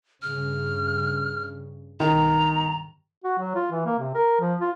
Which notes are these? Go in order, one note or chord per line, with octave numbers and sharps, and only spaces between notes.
G2 C#3 F6
B1 G2 D#3 A#5
F#4
F#3
F4
E3
A#3
C3
A#4
F3
F4